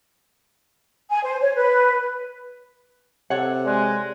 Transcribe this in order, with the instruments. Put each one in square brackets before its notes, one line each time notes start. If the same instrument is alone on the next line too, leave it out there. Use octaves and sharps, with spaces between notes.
[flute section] G#5
C5
C#5
B4
[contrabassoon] C3 [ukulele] A4 C#5 F#5
[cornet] G#3 [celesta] D5 C6 F#6